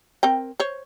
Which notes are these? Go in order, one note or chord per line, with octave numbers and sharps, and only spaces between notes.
C4 A#4 G5
C5 C#5